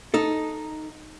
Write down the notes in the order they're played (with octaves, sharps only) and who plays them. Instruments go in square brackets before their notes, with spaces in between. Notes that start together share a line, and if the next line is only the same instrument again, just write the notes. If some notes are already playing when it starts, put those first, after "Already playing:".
[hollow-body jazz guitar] D#4 A4